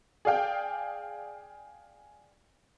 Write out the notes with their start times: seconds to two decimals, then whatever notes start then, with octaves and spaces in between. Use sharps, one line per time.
0.25 G#4 D5 F5 G5